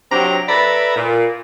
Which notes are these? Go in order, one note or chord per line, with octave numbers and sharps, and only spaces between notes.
C3 F#3 C4 D4 G4 A#5
A4 B4 D5 E5 A#5 B5
A#2